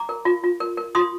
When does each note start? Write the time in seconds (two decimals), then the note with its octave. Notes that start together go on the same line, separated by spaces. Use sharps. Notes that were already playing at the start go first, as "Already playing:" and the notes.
Already playing: A#5 D6
0.09 A#4
0.25 F4
0.44 F4
0.60 A#4
0.77 A#4
0.95 F4 C6 D#6